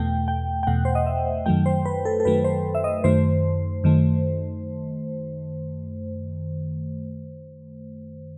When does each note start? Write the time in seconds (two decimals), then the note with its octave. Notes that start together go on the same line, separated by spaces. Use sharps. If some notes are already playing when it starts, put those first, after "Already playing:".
Already playing: E2 B2 A3 G5
0.28 G5
0.63 G5
0.67 E2 B2 A3 F#5
0.85 C5
0.95 D#5
1.06 E5
1.46 F#2 D#3 F#3 A3 G5
1.66 C5
1.86 B4
2.05 A4
2.20 A4
2.25 F#2 D#3 F#3 A3 B4
2.44 C5
2.75 E5
2.84 D#5
3.04 F#2 D#3 A3 C5
3.84 F#2 D#3 A3